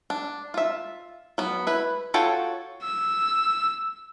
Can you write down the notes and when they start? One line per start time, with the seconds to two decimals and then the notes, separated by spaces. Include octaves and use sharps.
0.10 D4
0.54 F4 E5
1.38 F#3 B3
1.67 E4 B4
2.14 F4 F#4 A4 C#5 G5
2.83 E6